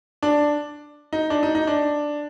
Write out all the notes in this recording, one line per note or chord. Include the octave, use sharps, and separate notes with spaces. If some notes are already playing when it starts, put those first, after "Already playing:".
D4
D#4
D4
D#4
D#4
D4